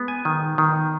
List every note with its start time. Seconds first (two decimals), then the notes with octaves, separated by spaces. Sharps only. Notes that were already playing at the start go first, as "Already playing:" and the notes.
Already playing: G#3 B3
0.08 G#5
0.25 D#3
0.58 D#3